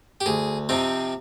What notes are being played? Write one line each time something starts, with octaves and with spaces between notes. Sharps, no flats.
G4
D2 G#4
C3 F3 C4 D#4